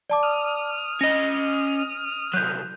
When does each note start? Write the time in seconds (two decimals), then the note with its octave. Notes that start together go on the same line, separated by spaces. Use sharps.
0.10 D5 A5 D6
0.23 D#6 F6
1.01 C#4 D#5 A#6
2.34 C2 F#3 F#6 G6